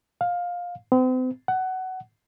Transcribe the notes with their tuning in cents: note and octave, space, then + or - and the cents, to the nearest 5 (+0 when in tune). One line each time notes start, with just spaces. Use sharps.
F5 +15
C4 -40
F#5 +15